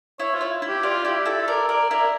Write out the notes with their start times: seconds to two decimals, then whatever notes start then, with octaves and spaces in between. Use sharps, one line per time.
0.19 E4 C#5
0.35 F4
0.41 E4
0.62 E4
0.68 G4
0.83 F4 D5
1.05 E4 G4
1.26 E4 A4
1.48 A#4 D5
1.68 A#4 D5
1.90 E4 A#4